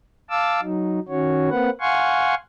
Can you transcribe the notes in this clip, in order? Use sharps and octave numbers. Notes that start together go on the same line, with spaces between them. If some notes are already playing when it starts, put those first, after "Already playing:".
F5 A5 D6 E6
F#3 D#4
D#3 C#4 F#4 C#5
A#3 C4 B4 F#5
F5 F#5 G#5 C6 C#6